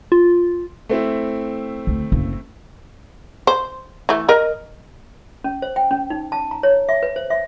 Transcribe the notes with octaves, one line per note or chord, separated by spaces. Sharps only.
F4
A3 C4 E4
D2
F#1
C5
E3 A3
A#4 D#5
C#4
C5
G5
C#4
D#4
A5
A#5
C#5
E5
B4
C5
E5